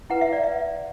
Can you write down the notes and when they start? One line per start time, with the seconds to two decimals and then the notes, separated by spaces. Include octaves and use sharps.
0.10 E4 B4 F#5
0.21 E5
0.33 D5
0.44 E5